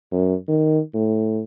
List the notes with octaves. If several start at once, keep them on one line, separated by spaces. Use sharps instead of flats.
F#2
D#3
A2